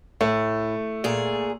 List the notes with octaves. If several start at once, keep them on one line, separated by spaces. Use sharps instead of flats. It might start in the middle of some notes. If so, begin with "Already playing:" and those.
A2 A3
A#2 G#4